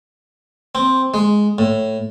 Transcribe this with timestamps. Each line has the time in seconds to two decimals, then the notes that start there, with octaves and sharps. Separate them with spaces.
0.75 C4
1.14 G#3
1.58 A2